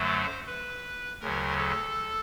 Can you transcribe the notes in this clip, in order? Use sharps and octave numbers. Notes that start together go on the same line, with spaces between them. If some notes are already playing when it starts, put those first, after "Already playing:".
Already playing: F#2 D3 F#3 A3 C5
B4
D2 C#3 F#3 A#4
A4